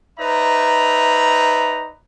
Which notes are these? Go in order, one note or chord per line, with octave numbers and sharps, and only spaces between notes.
D#4 B4 C5 D5 E5 A#5